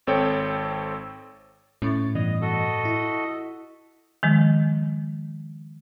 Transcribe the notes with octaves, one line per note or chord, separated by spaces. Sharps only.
G#1 C4 A4 C#5 G5
A2 C#4 C#6 A6
G2 B2 E3 D#5
F#4 A4 D#5
E4
D#3 F3 G#3